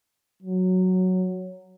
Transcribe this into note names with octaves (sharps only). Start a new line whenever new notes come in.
F#3